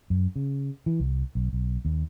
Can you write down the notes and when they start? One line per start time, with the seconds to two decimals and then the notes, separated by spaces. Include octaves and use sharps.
0.10 F#2
0.36 C#3
0.86 E3
1.00 C2
1.35 B1
1.53 B1
1.85 D#2